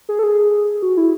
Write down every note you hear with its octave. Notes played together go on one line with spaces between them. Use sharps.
G#4
A4
G#4
F#4
E4